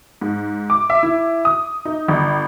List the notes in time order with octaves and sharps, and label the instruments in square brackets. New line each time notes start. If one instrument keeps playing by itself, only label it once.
[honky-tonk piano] G#2
D6
E5
E4
D#6
D#4
G1